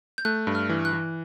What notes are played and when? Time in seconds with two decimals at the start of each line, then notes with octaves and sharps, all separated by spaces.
0.18 G6
0.25 A3 F#6
0.47 G2
0.55 F6
0.69 E3
0.85 F#6
0.93 E3